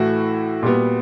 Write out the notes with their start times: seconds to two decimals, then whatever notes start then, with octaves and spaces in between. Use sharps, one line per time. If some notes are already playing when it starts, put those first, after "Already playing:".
Already playing: A2 E3 A3 E4 F#4
0.63 A#2 G3 B3